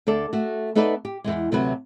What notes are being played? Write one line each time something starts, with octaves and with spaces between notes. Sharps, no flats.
D2 D4 A4 D5
A3 F#4
A3 B3 D#4 A4 B4 D5
G4
E2 C3 G#3
D2 C3 F#3 F#4 A4 B4